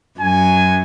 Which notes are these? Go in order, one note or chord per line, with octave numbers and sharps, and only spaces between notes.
F#2 F#3 G#5